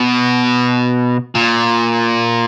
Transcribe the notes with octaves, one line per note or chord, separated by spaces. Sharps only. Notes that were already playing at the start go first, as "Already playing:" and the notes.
Already playing: B2
A#2